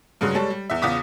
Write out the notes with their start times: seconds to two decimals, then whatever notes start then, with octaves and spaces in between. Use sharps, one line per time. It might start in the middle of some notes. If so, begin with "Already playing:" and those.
0.21 G2 C#3 F#3 G#3
0.35 G3 G#3 A4 C#5
0.50 G3
0.70 E2 E5
0.82 E2 C#3 F4 D6 D#6 B6